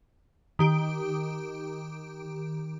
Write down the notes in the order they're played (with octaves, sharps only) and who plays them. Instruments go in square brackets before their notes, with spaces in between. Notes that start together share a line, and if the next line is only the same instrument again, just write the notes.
[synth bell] D#3 G4 D7